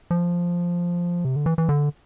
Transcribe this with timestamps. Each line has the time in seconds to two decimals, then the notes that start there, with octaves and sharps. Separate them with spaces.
0.11 F3
1.25 C3
1.36 D3
1.46 E3
1.58 E3
1.69 D3